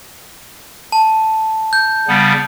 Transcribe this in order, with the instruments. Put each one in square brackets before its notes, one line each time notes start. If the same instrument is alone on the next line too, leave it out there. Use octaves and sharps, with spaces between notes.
[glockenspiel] A5
G6
[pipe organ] C#3 G3 B3